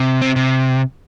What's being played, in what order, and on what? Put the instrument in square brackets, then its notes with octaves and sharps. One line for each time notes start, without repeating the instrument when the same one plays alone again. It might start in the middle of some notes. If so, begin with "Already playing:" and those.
Already playing: [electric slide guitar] C3
C4
C3